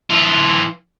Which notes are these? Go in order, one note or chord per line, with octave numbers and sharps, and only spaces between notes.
E3 F4